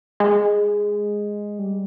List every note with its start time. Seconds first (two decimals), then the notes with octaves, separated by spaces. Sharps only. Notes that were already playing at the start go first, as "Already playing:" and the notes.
0.20 G#3
1.59 G3